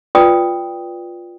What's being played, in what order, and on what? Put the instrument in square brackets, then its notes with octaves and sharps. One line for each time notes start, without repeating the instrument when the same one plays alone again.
[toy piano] F4 B4 D5 G5 D#6